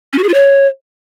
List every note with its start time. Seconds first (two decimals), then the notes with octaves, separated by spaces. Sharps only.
0.13 C#4
0.18 F#4
0.23 G#4
0.29 F4
0.34 C#5